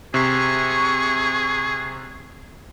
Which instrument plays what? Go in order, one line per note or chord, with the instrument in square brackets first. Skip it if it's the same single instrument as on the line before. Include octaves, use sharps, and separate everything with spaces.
[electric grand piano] C3 C7 [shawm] G#4 [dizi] C#6